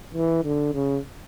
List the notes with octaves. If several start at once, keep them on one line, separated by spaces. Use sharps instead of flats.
E3
D3
C#3